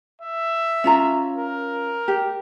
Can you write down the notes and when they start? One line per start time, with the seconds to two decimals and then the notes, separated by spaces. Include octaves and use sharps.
0.21 E5
0.84 C#4 F4 A#5
1.36 A#4
2.08 G4